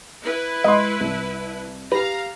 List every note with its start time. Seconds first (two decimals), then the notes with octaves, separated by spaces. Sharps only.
0.23 E4 B4
0.64 G#3 D#5 B5 C6
1.01 C2
1.92 G4 B4 F5 A#5